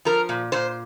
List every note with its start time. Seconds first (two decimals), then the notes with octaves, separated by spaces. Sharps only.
0.05 F3 A#4
0.29 A#2
0.52 A#2 C5